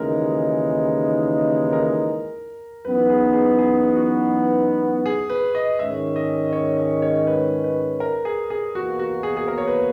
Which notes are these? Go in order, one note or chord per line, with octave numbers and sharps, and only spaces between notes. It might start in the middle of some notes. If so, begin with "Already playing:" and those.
Already playing: D#2 C#3 E3 G#3 D#4 A#4
A#4
F#2 E3 B3 D#4 B4
G#4
G#4
G#4
F#4
G#4
B4
D#5
G#2 D#3 G#3 C#4 E5
D#5
C#5
D#5
C#5
B4
B4
A#4
G#4
G#4
E2 B2 A#3 F#4
F#4
G#4
G#4
A#4
C#5
B4